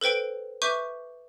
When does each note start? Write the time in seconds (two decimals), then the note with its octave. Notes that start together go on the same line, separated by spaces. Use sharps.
0.01 A4 B4 C5 G5 D7
0.62 B4 E5 C#6 D6 G6 D#7